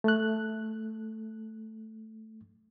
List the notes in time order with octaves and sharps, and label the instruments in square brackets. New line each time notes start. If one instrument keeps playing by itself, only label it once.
[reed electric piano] A3 F#6